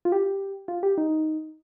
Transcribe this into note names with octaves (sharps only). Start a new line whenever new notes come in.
F4
G4
F4
G4
D#4